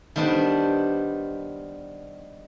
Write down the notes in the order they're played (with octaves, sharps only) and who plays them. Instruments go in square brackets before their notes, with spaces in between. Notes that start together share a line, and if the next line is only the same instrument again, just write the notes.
[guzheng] D#3 G3 B3 D4 C5